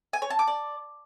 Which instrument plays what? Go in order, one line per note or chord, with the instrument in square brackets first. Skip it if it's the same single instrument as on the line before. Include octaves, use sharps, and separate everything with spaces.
[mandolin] G#5
C#5
A5
D6
D5